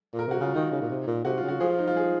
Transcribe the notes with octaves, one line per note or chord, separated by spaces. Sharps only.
A#2
A#4
C3 F#4
C#3 F4
D#3 D#4
C#3
A#2
C3
A#2
C3 F#4
F4
C#3 F#4
F3 G#4
F4
D#4
F4
G#4